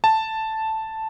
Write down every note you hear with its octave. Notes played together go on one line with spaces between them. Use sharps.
A5